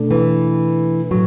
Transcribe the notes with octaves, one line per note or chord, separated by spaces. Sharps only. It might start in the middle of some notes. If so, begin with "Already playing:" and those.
Already playing: B2 A3 D4 A4 D5
E3
A2 F#3